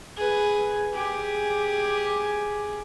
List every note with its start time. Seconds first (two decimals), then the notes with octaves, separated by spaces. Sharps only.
0.17 G#4 B4
0.93 G4 G#4